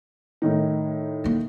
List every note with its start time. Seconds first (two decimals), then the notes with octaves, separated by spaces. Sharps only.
0.42 A2 D#3 D#4
1.24 D3 A#3